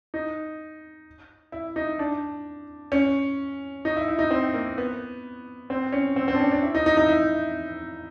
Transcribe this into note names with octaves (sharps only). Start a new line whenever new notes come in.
D#4
E4
D#4
D4
C#4
D#4
E4
E4
D#4
C4
A#3
B3
C4
C#4
C4
C4
D4
C#4
D4
E4
D#4
D#4
E4
D#4
E4